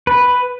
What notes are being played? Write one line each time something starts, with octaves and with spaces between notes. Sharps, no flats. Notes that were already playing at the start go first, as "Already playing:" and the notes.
B4